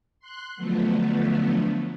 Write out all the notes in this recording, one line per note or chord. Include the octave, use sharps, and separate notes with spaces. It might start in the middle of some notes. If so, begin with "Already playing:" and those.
C6 F#6
D3 F3 F#3 A3 B3